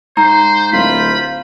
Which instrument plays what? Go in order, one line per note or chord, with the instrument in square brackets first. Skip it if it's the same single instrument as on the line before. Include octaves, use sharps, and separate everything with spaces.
[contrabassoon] G#2 [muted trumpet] C5 [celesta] A#5
[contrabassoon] D1 [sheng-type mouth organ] F4 C5 [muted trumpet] B5